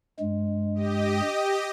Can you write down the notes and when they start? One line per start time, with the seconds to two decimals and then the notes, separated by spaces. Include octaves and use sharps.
0.20 G2 G#3
0.75 G4 D#5